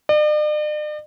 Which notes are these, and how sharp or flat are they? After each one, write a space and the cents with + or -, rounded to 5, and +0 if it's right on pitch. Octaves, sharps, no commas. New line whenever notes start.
D5 +45